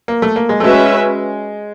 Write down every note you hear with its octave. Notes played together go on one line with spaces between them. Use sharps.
A#3
A3
A#3
G#3
A3
G#3 C#4 F#4 B4 E5